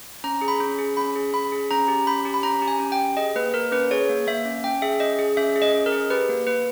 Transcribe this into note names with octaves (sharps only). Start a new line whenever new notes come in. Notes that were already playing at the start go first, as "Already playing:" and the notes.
C#4 A#5
G#4
B5
C#4
G#4
C#4 B5
G#4
C#4 B5
G#4
C#4 A#5
G4
C#4 B5
G4
B5
C#4 A#5
G4
G#5
C#4
G5
G4
G#4 D#5
A#3 B4
A#3 A#4
C#4 B4
G#4 C#5
A#3
A#3 E5
C#4
C#4 G5
G#4 E5
C#4 D#5
G#4
C#4 E5
G#4
D#5
C#4
A#4
G#4
G4 B4
A#3
A#3 B4